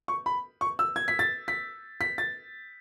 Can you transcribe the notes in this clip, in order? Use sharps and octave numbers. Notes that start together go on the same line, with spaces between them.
C#6
B5
C#6
E6
G#6
B6
A6
B6
B6
A6